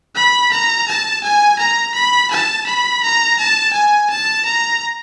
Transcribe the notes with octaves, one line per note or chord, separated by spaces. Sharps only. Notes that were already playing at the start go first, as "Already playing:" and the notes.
B5
A#5
A5
G#5
A#5
B5
A5
B5
A#5
A5
G#5
A5
A#5